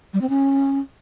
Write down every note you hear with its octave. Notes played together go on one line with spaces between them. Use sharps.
G3
C4
C#4